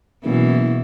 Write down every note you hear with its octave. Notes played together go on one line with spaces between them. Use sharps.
F#1 B2 E3